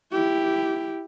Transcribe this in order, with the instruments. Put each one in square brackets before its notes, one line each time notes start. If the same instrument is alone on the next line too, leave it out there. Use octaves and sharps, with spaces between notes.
[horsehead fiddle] E4 G4